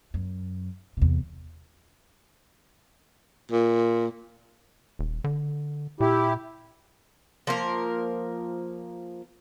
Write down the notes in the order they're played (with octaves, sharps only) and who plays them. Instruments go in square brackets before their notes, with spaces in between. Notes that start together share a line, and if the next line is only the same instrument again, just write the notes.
[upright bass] F#2
E2 C3
[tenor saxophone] A#2
[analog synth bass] D#1
D3
[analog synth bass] A#2 [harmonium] E4 G4
[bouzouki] F3 A#3 A#4